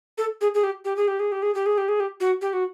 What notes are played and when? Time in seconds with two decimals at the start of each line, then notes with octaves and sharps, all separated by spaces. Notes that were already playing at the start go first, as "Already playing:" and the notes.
0.18 A4
0.41 G#4
0.54 G#4
0.63 G4
0.85 G4
0.97 G#4
1.08 G4
1.19 G#4
1.32 G4
1.42 G#4
1.55 G4
1.66 G#4
1.78 G4
1.88 G#4
2.00 G4
2.20 F#4
2.41 G4
2.53 F#4